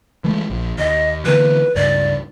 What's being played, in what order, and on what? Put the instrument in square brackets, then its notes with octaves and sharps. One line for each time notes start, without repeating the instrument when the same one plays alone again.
[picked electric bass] E3 G#3 A3
A#1
[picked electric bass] D#2 [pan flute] D#5
[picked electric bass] D3 E3 A#3 [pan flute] B4
[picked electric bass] C#2 G2 [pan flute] D5